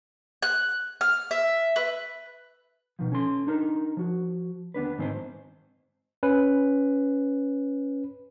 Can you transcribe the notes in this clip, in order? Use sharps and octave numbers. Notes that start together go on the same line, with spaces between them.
F#6
F6
E5
B4
B2 D#3 F3
C#4 A4 C6
D4 D#4 A#4
F3 F#4
D#2 B3 D4 B4
G#2 D#3 C4 A#4 C5
C#4 B4